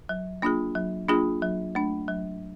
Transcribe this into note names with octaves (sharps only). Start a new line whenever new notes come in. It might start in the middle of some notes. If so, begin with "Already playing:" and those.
F#3
A#3 D4 F4 G#4
F#3
A#3 D4 F4 G#4
F#3
A3 D4
F#3